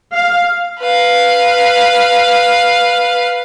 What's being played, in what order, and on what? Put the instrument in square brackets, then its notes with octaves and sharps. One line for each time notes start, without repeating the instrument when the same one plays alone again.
[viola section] F5
[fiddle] B4 F5